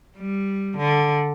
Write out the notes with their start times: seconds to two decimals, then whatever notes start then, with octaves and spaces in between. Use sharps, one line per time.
0.17 G3
0.78 D3